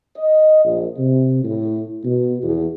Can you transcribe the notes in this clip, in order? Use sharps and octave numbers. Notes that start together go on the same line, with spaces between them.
D#5
A#1
C3
A2
B2
E2